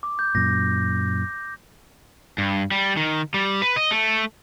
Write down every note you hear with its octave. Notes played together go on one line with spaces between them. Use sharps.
D6
G6
F#2 A#2 A#6
G2
G3
D#3
G3
B4
D#5
A3